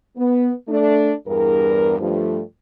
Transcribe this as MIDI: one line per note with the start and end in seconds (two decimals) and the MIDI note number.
0.17 0.50 59
0.68 1.12 57
0.68 1.12 62
1.27 1.97 40
1.27 1.97 43
1.27 1.97 70
2.00 2.40 43
2.00 2.40 53
2.00 2.40 57